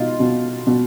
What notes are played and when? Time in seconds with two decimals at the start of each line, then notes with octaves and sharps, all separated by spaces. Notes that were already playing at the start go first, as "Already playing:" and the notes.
Already playing: B2 D#4 F4
0.20 B2
0.67 B2